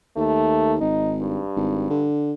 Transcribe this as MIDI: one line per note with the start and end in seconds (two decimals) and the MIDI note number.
0.17 0.79 39
0.17 0.75 57
0.81 1.40 32
0.81 1.15 63
1.21 2.07 43
1.56 1.89 32
1.90 2.34 50